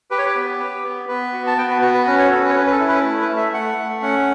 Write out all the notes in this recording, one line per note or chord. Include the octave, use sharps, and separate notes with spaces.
G4 B4
C#5
B4
B3
G4
B3
B3 B4
F#4
A5
B3 G5
B4
F#4 B4
B4
C#4 B4
C#5
C#4 A4
B4
C#5
C#4 B4
B4
A4
E4
B4
A3
B4
A3
E5
A3 F#5
A3
C#4 F#5